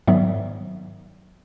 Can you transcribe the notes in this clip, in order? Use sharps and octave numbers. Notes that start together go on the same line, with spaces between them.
G#2 D#3 F#3 B3 D5 E5